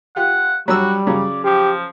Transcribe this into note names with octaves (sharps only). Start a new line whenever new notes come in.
F4 G4 F#5
F#3 G3 D4 F#4 E6
C#3 F#3 D5
F3 G4